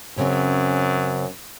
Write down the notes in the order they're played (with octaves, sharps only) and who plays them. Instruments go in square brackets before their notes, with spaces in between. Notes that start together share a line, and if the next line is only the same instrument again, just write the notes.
[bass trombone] F#2 [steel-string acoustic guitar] C#3 C4 C#4